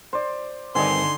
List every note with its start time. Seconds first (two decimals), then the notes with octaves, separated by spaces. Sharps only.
0.13 C5 D5
0.75 G2 D3 D#3 C4 D#4 D#5 G#5 C6